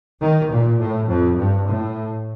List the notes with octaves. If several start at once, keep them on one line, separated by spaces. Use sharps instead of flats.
D#3
A#2
A2
F2
G2
A2